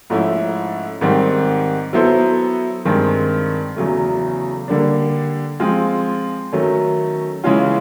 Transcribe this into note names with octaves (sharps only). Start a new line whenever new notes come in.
G#2 F3 A3 C#4 E4
G#2 D#3 G3 C4
F#3 B3 E4 A4 C5
G2 D#3 G#3 C4
E2 C#3 F#3 A3
D3 G3 A#3 D4
F3 G#3 C4 F4
D#3 F#3 A3 C#4
C#3 E3 G#3 C#4 F4